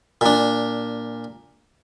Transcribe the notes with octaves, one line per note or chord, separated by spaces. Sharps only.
A#2 D4